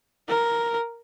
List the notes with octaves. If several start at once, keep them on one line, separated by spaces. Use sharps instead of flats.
A#4